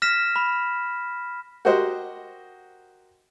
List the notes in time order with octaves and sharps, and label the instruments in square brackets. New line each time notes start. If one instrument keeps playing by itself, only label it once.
[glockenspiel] F6 A#6 B6 E7
B5
[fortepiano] F#4 G4 A#4 C5 D#5 F#5